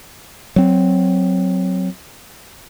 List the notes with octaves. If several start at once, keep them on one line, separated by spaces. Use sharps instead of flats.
F#3 C4